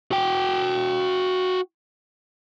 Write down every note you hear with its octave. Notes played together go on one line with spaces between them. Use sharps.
F#4 G5